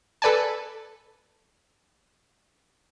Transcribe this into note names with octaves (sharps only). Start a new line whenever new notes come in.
A4 B4 D5 G#5 A5